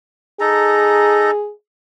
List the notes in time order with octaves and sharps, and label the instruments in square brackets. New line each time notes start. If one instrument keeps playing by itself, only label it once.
[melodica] D#4 A4 A#5 [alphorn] G#4